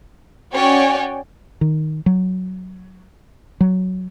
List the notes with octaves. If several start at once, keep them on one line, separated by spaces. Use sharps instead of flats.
C#4 F#4 C#5 D5 G5 G#5
D#3
F#3
F#3